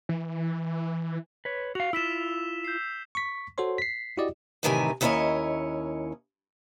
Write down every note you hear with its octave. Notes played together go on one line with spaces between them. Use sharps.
E3
B4 C#5
F#4 F5 F7
E4 F4 E6 B6 E7
G6 C7
C#6 B6
F#4 A4 C5 C#5 C6
B6 C7
E4 F#4 G4 D5 D#5
F#2 A2 C3 D#3 E3 G#5
D#2 C#4 E4 A#4 C#5 D#5